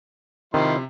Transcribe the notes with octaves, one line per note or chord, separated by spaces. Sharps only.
C3 D#3 F3 E4 C6